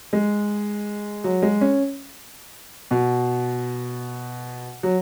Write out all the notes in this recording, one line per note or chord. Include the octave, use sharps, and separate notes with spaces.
G#3
F#3
G#3
C#4
B2
F#3